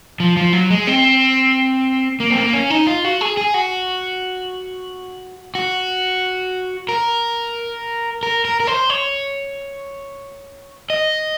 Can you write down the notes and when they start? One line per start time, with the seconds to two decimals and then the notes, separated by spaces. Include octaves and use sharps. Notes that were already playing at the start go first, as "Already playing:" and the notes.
0.20 F3
0.37 F3
0.53 F#3
0.70 G#3
0.87 C4
2.20 A#3
2.30 C4
2.37 A#3
2.53 C#4
2.70 D#4
2.87 F4
3.05 F#4
3.21 G#4
3.37 G#4
3.54 F#4
5.55 F#4
6.89 A#4
8.23 A#4
8.45 A#4
8.60 A#4
8.67 C5
8.90 C#5
10.90 D#5